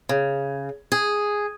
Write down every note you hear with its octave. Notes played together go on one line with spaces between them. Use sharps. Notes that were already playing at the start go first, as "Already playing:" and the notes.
C#3
G#4